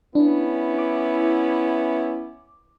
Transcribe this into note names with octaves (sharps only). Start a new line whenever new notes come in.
B3 C#4 D4 E4
D6